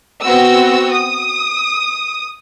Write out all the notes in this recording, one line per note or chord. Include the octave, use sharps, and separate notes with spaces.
B3 C4 F#4 E6
D#6